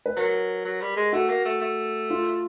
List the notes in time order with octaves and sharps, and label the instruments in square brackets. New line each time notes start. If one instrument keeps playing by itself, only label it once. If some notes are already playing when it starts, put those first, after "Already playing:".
[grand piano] B4
[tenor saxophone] F#3 [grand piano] A#4
[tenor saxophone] F#3
G3
G#3
[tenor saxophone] A3 [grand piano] F#4
[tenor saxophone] A#3
A3
A3
[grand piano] F4